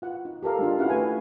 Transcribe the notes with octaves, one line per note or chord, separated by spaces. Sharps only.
F4 F#5
D#4
G4 A4 A#4 F5
G#3 D4 F4
C#4 D#4 E4 F#4 F5 F#5
A3 B4 G#5